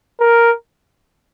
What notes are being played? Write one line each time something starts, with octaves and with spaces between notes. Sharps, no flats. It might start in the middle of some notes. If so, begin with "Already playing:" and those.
A#4